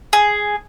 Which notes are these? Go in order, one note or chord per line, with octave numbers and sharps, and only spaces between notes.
G#4